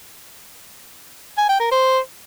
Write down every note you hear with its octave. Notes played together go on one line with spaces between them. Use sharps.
G#5
G5
A#4
C5